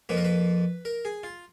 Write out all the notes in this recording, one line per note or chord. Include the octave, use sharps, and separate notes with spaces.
F2 F3 A#3 B4
A#4
B4
A#4
G#4
F4